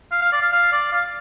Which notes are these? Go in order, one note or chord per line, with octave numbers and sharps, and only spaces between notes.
F5
F5
D5
F5
F5
D5
F5